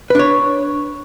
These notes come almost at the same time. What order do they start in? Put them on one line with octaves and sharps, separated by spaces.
B4 D4 C#5